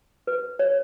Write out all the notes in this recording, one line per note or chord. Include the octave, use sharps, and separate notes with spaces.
B4
C#5